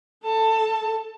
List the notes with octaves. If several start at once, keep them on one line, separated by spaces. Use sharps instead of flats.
A4 A5